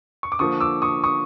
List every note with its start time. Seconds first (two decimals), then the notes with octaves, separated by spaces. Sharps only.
0.23 C#6
0.32 D6
0.39 D3 F3 A#3 C#6 D#6
0.60 D6 E6
0.82 C#6 D#6
1.04 C#6 D#6